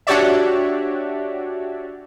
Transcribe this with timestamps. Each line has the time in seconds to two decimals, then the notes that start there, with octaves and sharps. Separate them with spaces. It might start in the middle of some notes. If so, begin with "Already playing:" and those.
0.07 D4 F#4 G4 C#5 D5 E5